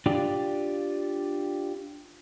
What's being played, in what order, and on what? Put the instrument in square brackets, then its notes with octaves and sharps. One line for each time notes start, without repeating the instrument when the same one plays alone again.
[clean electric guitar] D4 F4 G4 D5